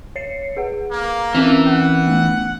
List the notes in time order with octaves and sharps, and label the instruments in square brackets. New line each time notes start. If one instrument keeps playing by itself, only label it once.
[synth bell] C#5 C7 C#7
G#4 B4 F#5
[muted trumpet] A#3
[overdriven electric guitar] E3 [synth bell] C4 C#4 A#4
[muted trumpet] F#5
[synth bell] A3 B3